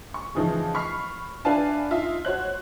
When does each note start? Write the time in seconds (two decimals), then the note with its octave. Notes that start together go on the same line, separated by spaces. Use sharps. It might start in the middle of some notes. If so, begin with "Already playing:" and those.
0.14 C#6
0.35 C#3 E3 F3 D#4 G#4
0.74 B5 C#6 F6 B6 C7
1.45 D4 E4 B4 F5 G#5 A5
1.91 D#4 F4 E5
2.25 F#4 C5 C#5 F#6